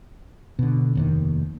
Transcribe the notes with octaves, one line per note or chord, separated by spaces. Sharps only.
B2 D3
F1 D#2 D#3